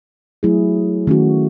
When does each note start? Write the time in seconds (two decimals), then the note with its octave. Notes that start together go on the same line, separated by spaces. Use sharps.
0.43 F#3 A3 E4 G#4
1.07 D#3 A3 C#4 F#4